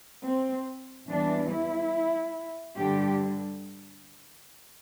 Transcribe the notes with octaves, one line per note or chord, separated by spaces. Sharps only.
C4
E2 E3 G3 D4
E4
G2 D3 G3 G4